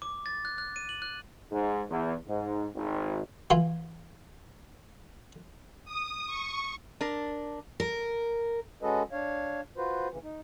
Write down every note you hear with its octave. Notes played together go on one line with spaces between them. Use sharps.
D6
A6
F#6
F#6
D#7
F#7
F#6
G#2
E2
G#2
G#1
E3 F4
D#6
C#6
D4 A#4
A#4
G#3 C#4 F#4 A4 B4 D#5
D4 C#5 F5
F4 F#4 B4 C5
D2 C#3 E3
D#4